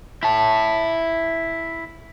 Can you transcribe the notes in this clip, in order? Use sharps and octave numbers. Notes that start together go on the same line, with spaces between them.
E4 A5